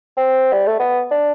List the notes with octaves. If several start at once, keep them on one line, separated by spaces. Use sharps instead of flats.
C4
G3
A3
B3
D4